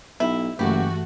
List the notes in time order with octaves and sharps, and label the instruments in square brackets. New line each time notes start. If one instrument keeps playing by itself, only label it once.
[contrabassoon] B1 [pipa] E4
[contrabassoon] F#1 [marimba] G2 E3 [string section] A3 F#4 [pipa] G4